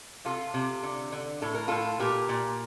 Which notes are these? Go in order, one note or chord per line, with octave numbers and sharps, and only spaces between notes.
C3 F4 A4
C3
D3
D3
A2 A4
A#4
A2 F4 A4
A#2 G4 A#4
A#2